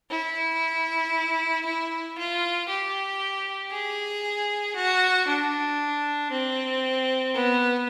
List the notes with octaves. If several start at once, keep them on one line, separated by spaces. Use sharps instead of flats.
E4
E4
F4
G4
G#4
F#4
D4
C4
B3